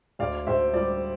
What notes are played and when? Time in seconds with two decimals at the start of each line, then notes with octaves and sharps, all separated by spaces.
0.19 D2 D5 F5
0.47 D2 C5 E5
0.73 G3 D5